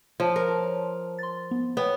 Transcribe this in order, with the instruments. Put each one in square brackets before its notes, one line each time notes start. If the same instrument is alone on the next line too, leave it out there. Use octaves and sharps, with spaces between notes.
[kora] F3 [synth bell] C#5 A5 C6
[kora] A#4
[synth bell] C6 A6
B3
[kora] B3 [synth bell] C#5 G5